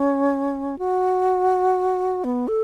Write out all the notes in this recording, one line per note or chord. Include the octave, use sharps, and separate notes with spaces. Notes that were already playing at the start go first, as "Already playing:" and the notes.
Already playing: C#4
F#4
B3
A4